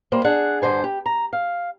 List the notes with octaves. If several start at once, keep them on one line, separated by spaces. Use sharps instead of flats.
G3 A#3 C5
D4 G#4 F#5
G2 D3 C5 G#5
G4
A#5
F5